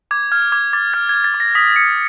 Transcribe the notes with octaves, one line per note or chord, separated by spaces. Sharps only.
D6 G#6
F6 G#6
D6 G#6
D6 A6
F6 G#6
G#6
F6
A6
D6
A#6
D#6 B6
D#6 C#7